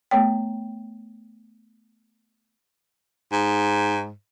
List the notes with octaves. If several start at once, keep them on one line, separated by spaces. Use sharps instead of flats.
A3 B3 C#5 G5
G#2